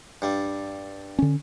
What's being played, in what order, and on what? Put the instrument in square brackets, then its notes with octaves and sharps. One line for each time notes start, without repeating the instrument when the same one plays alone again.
[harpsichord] G2 G3
[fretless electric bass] D3 C#4